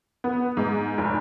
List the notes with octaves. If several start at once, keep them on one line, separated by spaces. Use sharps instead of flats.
B3
G#2
F1